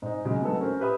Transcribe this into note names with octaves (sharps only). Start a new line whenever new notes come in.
G#2 D#4
C#3 F#3 G#3
F#3 A3 B3 D#4 F#4 A4
C#4 A#4 C5
G4 B4 E5 B5 D#6